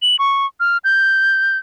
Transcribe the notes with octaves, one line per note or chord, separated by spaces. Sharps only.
F#7
C#6
F6
G6